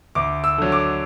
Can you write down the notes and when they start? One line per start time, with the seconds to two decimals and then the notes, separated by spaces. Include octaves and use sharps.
0.15 D2 D6
0.44 E6
0.58 D3 F#3
0.72 D6